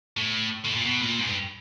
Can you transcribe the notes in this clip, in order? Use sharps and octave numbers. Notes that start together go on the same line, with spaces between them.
A2
A2
A#2
B2
A#2
G#2
G2